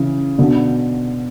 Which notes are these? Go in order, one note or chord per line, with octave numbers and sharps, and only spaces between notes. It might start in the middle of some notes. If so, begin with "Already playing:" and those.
Already playing: C#3 E3
B2 D3